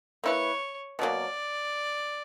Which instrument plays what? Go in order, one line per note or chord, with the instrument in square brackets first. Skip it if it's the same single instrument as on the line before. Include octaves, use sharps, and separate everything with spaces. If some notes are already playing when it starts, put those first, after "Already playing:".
[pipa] A#3 E4 B4 [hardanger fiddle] C#5
[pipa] B2 F#3 A#3 [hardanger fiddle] D5